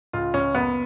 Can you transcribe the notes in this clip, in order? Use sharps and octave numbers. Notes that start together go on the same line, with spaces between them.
C#2 F4
C#2 C#4
F#1 B3